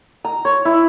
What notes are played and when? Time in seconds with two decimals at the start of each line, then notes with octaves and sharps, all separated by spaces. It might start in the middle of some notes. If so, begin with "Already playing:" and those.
0.25 A#5
0.45 C#5
0.65 E4